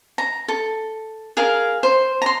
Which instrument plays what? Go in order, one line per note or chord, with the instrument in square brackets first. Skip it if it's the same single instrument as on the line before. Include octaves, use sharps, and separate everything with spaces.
[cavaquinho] A#5
A4
G#4 A#4 F5
C5
A#5 C6